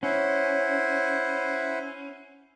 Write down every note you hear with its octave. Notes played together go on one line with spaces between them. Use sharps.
C#4 E4 C5 F#5